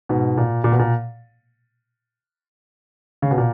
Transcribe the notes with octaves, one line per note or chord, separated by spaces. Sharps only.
G#2 B2
A#2
A#2
B2
A#2
C#3
B2
A#2